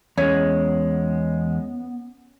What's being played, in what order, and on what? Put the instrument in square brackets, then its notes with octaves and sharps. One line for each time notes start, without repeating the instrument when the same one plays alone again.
[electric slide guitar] E2 G#3 [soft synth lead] B3 [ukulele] C#4